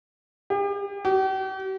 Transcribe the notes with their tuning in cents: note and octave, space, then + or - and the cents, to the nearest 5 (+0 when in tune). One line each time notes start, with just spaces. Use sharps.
G4 +40
G4 -45